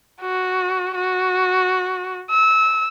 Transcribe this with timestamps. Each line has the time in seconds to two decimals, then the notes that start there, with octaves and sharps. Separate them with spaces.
0.21 F#4
0.95 F#4
2.30 E6